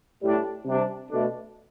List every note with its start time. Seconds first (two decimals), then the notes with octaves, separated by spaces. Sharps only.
0.22 A2 G3 D4
0.65 C3 G3 D4
1.09 B2 A3 D4